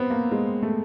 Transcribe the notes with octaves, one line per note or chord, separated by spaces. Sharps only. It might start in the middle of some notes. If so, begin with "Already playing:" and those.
Already playing: B3 C4
A#3
G#3
A3